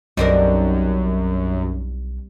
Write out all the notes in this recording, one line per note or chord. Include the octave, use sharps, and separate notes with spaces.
B1 F#2 G3 C4 D4 D#4 A#4